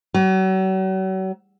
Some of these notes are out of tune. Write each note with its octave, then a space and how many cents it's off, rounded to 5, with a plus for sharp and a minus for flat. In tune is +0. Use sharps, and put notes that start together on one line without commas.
F#3 +40